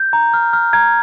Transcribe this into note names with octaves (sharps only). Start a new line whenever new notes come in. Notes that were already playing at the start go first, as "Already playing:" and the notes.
Already playing: G6
A#5
F6
F6
A#5 G#6